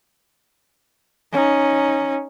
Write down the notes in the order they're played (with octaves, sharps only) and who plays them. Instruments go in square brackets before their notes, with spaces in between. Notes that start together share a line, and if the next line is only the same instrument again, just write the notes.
[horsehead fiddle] C#4 D#4